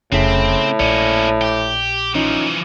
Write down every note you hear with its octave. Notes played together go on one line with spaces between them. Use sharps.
F1 A2 C#3 C4 E4 B6
A#1 A#3 C#4 D5
G4
E3 F3 C#4 D#4 F4